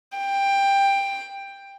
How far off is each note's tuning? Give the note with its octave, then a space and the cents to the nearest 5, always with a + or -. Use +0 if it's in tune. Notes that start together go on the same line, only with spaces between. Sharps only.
G5 +15